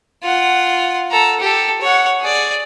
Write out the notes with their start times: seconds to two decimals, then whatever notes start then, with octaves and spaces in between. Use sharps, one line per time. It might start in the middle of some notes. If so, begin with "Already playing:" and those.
0.23 F4 F#5
1.11 A4 A#5
1.40 G4 A4
1.81 C#5 F#5
2.20 G#4 D5